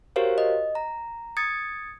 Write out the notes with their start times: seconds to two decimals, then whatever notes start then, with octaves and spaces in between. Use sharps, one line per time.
0.16 F#4 G4 A#4 C5 C#5 F5
0.38 D#5
0.75 A#5
1.37 D#6 G#6 A6 C#7